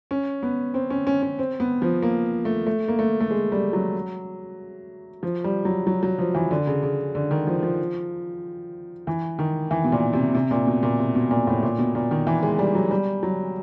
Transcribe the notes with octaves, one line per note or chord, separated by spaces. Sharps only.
C#4
B3
C4
C#4
C#4
C#4
C4
B3
F3
A#3
A3
A3
A#3
A3
A3
G#3
G3
F#3
F3
G3
F#3
F#3
F#3
F3
E3
D3
C#3
C#3
D3
D#3
F3
F3
E3
D#3
E3
B2
A#2
C3
C3
A#2
B2
A#2
C3
B2
A#2
A2
A#2
B2
A#2
D#3
E3
G#3
G3
F#3
G3
F#3